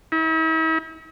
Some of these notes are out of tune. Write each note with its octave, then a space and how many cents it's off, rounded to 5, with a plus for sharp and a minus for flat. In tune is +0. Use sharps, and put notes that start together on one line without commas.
E4 -45